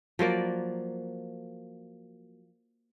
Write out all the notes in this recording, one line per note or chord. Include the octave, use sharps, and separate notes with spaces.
F3 F#3 A#3 D5